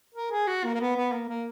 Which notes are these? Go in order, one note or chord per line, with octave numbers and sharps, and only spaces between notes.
A#4
G#4
F#4
A#3
A#3
B3
B3
A#3
A#3